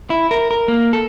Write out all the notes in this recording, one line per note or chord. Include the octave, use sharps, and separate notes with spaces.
E4
A#4
A#4
A#3
A4